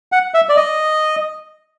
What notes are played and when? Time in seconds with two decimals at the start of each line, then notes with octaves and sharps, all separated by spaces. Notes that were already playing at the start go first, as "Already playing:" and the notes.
0.12 F#5
0.34 E5
0.49 D5
0.57 D#5